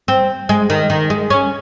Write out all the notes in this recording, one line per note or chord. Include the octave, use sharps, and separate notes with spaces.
C4
G#3
D#3
D#3
G#3
C#4